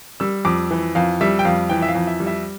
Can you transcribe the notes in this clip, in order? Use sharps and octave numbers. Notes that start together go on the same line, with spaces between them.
G3 E6
F2 D6
E3
F2 F5
G3 E5
G5
F2 F5
E3 G5
E5
F5
F2
E5
G3
E5